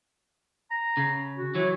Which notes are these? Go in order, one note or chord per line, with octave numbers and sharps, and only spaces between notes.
A#5
C#3
F#4
E3 F#3 C#5